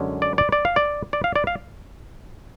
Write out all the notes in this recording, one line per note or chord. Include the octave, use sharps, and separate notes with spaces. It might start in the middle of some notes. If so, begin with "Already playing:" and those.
Already playing: F#2 D3 G#3 C#4
D5
D5
D5
F5
D5
D5
F5
D5
F5